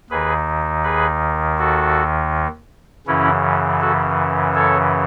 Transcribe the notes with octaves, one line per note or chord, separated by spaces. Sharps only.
D#2 D#3 G#4 B4
G#4 B4
F#4 A4
F#2 C#3 E3 C#4 E4
F#4 A4
A4 C#5